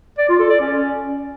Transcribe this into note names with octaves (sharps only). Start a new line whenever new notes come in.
D5
F4
A4
D5
C#4